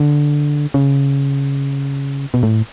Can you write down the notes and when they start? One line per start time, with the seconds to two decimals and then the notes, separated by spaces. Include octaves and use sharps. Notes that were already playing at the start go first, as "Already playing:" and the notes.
Already playing: D3
0.74 C#3
2.34 B2
2.43 A2